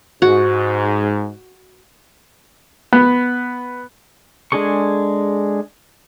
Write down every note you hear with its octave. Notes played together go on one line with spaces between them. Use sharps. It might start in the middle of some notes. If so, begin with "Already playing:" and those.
G#2 F#4
B3
G#3 D4 G#4 A4 C#6